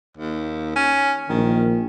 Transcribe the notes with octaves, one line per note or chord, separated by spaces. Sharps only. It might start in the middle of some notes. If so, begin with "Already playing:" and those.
D#2
C#4
A#1 D#3